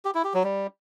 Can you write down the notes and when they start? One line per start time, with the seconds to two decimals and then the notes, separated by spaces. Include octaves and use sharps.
0.05 G4
0.15 E4
0.24 G4
0.34 F#3
0.44 G3